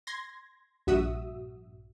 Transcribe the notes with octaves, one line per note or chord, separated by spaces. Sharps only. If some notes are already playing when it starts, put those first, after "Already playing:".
C6 G#6 A#6
A#1 G2 F#4 E5 D#6 E6